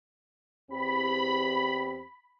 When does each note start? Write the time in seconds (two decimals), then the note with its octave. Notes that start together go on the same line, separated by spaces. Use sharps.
0.70 E2 C4 G4 B5